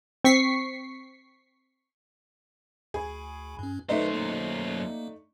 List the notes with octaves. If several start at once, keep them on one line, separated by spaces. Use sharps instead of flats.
C4 C#6 B6 C7
D2 G#4 B5
G2 C#4
F#2 A3 D4 D#4 B4 C5
A#3